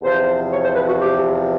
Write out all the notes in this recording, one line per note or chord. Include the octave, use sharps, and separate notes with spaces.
E2 C3 F3 C5
C#5
C5
B4
F#4
G4